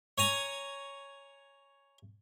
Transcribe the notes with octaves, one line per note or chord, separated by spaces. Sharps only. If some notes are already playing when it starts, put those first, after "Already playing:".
C#5 G#5 A#5